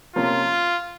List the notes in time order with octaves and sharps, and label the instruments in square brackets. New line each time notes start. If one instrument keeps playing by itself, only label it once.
[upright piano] C3 F3 A#3 C#4 [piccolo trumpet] F4